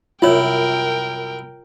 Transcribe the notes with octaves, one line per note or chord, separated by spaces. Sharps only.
C2 F#2 E4 F4 A#4 C#5 G5